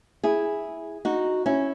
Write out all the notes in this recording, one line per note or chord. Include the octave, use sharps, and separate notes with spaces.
E4 G#4
D#4 F#4
C#4 E4